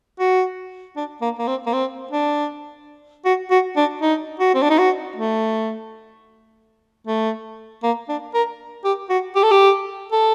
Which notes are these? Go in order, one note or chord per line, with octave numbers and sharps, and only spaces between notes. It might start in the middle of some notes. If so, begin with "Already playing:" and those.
F#4
D4
A#3
A#3
C4
A#3
C4
D4
F#4
F#4
D4
D#4
F#4
C4
D4
D#4
F#4
A3
A3
A#3
D4
A#4
G4
F#4
G4
A4
G4
A4